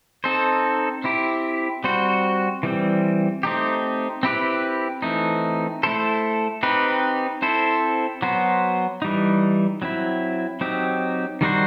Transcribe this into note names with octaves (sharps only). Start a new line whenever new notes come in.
C4 D#4 A4 C5
C4 E4 G4
G3 C4 F#4 C5
E3 G3 C4
A3 C4 D#4 G4
C4 E4 G4 B4
E3 A3 C4 D#4
A3 E4 A4 C5
C4 D#4 G4 B4
C4 E4 A4 C5
F#3 B3 F#4 C5
E3 G3 D#4
F#3 C4 E4
F#3 C4 D#4 G4
D#3 G3 D#4 F#4 C5